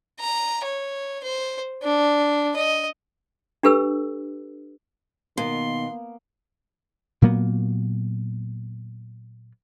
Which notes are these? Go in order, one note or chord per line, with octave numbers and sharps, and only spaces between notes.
A#5
C#5
C5
D4
D#5
D4 G4 A4 B4 E6
B2 D#3 A#3 C6
A#2 F#3 A#3 B3